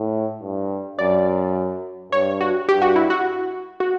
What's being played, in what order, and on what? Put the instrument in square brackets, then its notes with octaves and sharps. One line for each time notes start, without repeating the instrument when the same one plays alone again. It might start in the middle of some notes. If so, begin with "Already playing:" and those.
Already playing: [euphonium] A2
G2
[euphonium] F#2 [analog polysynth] D5
[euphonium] G2 [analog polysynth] C#5
[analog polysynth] F#4
[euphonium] G2 [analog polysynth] G4
[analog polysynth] F#4
E4
F#4
F#4